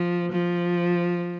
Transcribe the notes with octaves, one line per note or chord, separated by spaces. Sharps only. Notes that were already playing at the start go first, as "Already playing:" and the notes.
Already playing: F3
F3